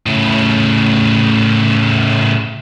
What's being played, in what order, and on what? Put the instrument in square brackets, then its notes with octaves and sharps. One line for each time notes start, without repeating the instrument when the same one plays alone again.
[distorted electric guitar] A2 C#3